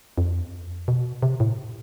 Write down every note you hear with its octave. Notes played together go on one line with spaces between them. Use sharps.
F2
B2
C3
A2